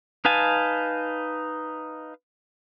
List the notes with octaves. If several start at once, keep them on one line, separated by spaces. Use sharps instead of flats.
D#4 B4 F5 G#5 A5